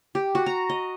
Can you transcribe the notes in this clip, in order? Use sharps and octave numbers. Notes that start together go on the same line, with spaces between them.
G4
F#4
A#5
D#5